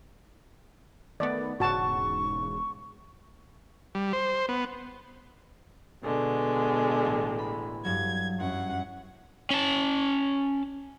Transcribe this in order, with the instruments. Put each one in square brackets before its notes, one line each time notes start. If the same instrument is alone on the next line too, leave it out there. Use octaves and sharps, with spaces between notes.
[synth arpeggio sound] D#3 A3 B3 [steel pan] D5
[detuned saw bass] E1 [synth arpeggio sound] G#2 C#3 [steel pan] F#4 A5 [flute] C#6
[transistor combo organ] G3
C5
B3
[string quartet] B2 D3 G#3
[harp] A1
B5
[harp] G2 F#3 [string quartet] G#6
[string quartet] F#2 F#5
[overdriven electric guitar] C#4 A5